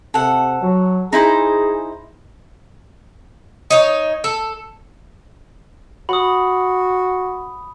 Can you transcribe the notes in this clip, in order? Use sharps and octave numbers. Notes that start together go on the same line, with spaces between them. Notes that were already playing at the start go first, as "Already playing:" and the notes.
C3 A4 F#5
F#3
D#4 E4 G#4 C5
D#4 C#5
A4
F#4 B5 D#6